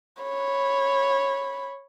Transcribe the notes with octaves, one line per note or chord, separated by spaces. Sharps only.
C#5 B5